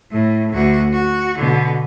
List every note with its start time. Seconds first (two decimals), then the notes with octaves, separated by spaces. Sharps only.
0.11 A2
0.52 D2 F#4
0.93 F#4
1.37 B2 D3